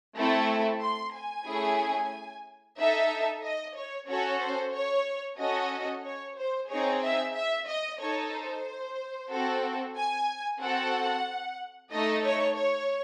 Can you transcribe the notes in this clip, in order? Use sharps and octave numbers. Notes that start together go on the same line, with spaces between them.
A3 C4 E4 A4
C6
G#5
A3 C#4 E4 G#4
D#4 A4 E5
D#5
C#5
C#4 F#4 A4 C#5
C5
C#5
C#4 F#4 A4 D#5
C#5
C5
C4 D#4 G#4 C#5
E5
E5
D#5
D#4 A4 C#5
C5
C4 F#4 A4
G#5
C4 F#4 A4 F#5
A3 D#4 A4 D#5
C#5
C#5